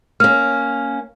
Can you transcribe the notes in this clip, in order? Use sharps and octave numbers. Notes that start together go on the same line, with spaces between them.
A#3 C#4 F6